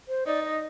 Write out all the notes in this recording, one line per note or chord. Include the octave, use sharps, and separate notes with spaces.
C5
D#4 D5
D#5